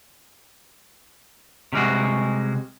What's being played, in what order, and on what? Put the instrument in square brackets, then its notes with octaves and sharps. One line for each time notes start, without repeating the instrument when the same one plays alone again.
[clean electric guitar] C3 G3 G#3 F#4